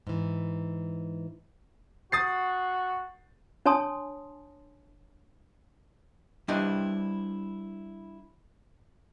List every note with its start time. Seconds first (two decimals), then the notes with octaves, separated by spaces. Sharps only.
0.07 G#2 E3
2.12 F#4 D#6 A6 C7
3.66 D4 C#5 G#5 A5 C6 D#6
6.48 G3 D4 E4 B4 C5 D#5